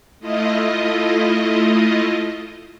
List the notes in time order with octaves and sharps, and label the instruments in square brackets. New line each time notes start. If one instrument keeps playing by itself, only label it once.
[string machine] A3 E4 F4 D#5